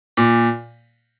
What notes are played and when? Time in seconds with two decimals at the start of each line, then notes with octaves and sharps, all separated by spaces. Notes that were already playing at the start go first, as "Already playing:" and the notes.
0.17 A#2